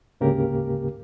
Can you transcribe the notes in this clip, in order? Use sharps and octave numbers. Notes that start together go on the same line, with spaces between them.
D2 G#2 C#3 A#3 G4 A#4